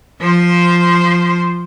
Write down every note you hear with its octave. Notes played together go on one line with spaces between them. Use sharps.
F3 C5